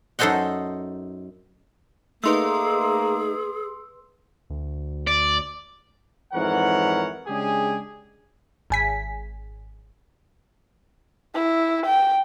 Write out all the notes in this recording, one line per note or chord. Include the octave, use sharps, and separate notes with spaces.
F#2 D#4 A4 C5 D#5 F#5
A3 A#3 D#4 G#4 B4 C6 E6
D2
D5
F2 G#2 E3 A#4 C#5 F#5
C#3 G#3 D4 G4 G#4
G#1 G#5 B6
E4
G5